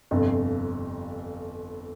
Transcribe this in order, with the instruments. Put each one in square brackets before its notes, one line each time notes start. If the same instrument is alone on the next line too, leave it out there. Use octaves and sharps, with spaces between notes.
[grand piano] G1 F2 C3